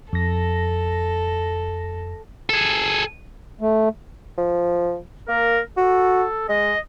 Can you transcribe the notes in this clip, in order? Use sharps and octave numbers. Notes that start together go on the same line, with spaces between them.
F2 A4 A#6
G#4 A4
A3
F3
A#3 A#4
F#4 A4
G#3 D#5